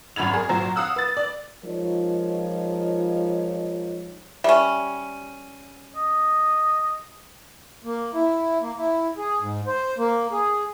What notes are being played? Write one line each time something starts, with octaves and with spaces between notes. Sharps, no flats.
G#1 F#2 B5 G#6 F7
G#4 A#4
G#1 A#2 F#3 C5 A#5
F5 F#5 D#6 E6 F#6
B4 A6
D5
F3 G#3 D#4 F4 A#4 C#5
G3 C#4 E5
D#5
A#3
E4
A#3
E4
G#4
G#2
C5
A#3
G#4